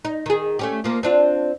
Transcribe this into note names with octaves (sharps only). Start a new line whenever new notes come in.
D#4
D#3 G#4
A3 C#4 G4
F3 A#3
C4 D4 F4